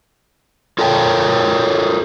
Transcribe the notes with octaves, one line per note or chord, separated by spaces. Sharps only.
F4 A4 A#4 C#5 G5